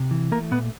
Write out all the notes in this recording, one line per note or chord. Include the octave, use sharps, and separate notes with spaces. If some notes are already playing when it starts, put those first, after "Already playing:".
Already playing: C3
E3
A3 A#3 A#4
A#2 B3 B4